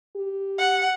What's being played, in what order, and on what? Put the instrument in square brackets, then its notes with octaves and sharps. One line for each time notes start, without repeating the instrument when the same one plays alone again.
[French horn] G4
[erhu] F#5